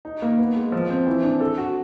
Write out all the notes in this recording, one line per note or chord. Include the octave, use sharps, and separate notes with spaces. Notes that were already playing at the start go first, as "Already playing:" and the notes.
D#4
A#3
B3
G#3
F3
C4
E3
D4
A4
F#4